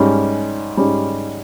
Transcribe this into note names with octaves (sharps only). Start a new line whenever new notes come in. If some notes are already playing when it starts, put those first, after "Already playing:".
Already playing: G#2 G3 C#4
G#2 G3 C#4